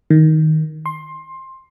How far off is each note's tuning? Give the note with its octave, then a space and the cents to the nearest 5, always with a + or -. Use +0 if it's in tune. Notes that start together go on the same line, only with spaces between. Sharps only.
D#3 +10
C6 +15